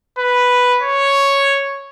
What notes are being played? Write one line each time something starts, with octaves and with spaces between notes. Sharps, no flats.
B4
C#5